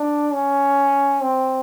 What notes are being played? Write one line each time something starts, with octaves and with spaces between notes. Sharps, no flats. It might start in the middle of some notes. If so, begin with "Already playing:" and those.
Already playing: D4
C#4
C4